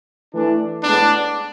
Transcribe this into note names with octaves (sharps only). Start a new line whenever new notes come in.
E3 A3 D4
A2 G#3 B3 D4